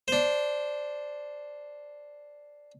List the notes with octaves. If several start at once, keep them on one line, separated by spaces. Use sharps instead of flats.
D4 C5